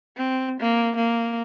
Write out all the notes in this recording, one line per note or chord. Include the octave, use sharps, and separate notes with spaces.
C4
A#3
A#3